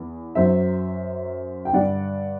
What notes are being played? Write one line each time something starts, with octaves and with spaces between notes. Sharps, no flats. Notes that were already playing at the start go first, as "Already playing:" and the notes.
Already playing: E2
F#2 F#3 C5 E5
G5
G2 D3 G3 D5 F#5